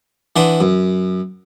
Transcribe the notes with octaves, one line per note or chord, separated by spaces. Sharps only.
E3 D4 F#5 C6 D6 D#6
F#2